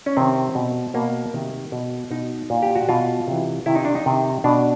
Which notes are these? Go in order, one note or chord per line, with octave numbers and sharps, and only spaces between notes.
C#4
C3 D#3 C4
B2
B2 A#3
C3 D#3
B2
B2 D#4
A#2
G4
F#4
B2 F4
C3 E3
C3 D#3 E4
D#4
D4
D#4
C3 D#3
B2 D4